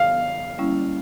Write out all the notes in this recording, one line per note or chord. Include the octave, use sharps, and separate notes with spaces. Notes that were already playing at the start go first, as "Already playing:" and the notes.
Already playing: D3 F3 G#3 B3 F5
G3 A#3 C#4 E4